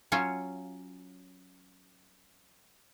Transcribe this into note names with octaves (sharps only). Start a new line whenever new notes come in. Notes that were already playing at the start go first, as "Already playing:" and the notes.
F#3 C#4 F4 C#5